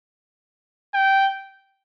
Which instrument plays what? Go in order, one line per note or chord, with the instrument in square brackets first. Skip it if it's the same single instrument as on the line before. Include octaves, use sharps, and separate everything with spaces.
[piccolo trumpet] G5